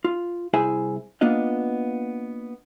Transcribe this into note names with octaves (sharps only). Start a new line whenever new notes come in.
F4
C2 E4 G#4 C5 E5 G#5
A#3 B3 D4 F4 D#5